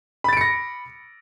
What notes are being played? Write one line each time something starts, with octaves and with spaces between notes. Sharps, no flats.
B5 A6 A#6 C#7 D7